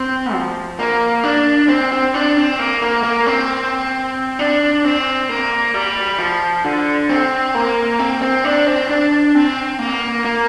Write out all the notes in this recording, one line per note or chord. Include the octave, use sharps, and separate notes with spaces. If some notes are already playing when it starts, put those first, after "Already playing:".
Already playing: C4
F3
A#3
D4
C4
C4
D4
C4
A#3
A#3
A#3
C4
D4
C4
A#3
G3
F3
D3
C4
A#3
C4
C4
D4
C4
D4
C4
A#3
A#3